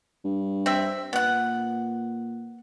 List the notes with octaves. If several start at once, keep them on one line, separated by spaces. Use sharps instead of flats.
G2
C4 E5
A#2 B3 F#5